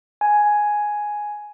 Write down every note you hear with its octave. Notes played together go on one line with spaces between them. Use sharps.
G#5